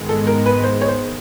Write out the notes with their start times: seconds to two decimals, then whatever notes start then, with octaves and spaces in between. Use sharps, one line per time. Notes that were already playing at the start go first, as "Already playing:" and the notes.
Already playing: G#2 D#3 G#3 B3
0.09 A4
0.27 A#4
0.46 B4
0.63 C5
0.81 C#5
0.88 C5